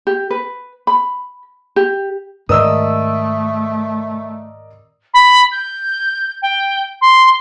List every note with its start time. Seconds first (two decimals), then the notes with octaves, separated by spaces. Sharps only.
0.07 G4
0.31 B4
0.87 B5
1.76 G4
2.49 G#2 D#3 A3 A#4 D5 D#5 D#6 E6
5.14 B5
5.52 G6
6.42 G5
7.01 C6